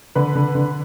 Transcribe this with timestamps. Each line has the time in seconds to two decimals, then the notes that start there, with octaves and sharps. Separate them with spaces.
0.15 D3 B4
0.35 D3
0.55 D3